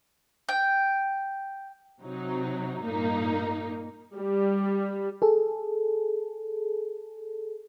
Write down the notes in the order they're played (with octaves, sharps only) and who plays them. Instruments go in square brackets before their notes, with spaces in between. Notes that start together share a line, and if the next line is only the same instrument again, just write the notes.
[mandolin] G5
[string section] C3 F#3 D#4
G2 A#2 A#3 D#4
[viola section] G3
[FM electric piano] G#4 A4